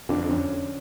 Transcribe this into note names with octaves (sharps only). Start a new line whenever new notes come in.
F2 D3 D4
C#4